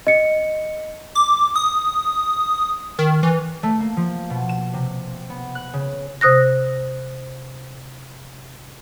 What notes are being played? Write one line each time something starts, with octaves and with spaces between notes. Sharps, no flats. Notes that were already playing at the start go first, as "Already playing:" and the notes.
D#5 C#7
D6
D#6
D#3
E3
A3
A#3
F3
B2
E7
C3
B3
F#6
C#3
C3 C5 D#6 F#6 A#6